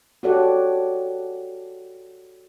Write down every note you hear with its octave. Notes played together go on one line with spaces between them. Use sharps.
F#4 G4 A4 C#5 D5 F#5